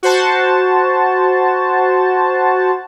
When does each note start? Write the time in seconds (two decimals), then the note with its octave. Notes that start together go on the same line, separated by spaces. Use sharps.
0.03 F#4 C5 A5